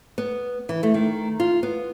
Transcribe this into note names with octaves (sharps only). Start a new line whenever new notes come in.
B3
E3
A3
D#3
F4
B3